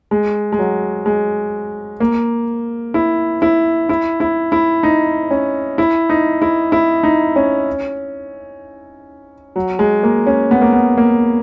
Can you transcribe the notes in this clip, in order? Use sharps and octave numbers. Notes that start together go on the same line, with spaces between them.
G#3
G#3
F#3
G#3
A#3
E4
E4
E4
E4
E4
D#4
C#4
E4
D#4
E4
E4
D#4
C#4
F#3
G#3
A#3
C#4
B3
A#3
B3
A#3